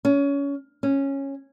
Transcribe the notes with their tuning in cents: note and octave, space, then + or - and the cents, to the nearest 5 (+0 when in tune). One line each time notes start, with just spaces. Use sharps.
C#4 +25
C#4 -10